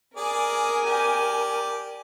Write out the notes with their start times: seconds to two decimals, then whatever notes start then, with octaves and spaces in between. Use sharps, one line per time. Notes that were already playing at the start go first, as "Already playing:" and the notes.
0.16 G#4 A#4 D5 G#5
0.85 G4 D5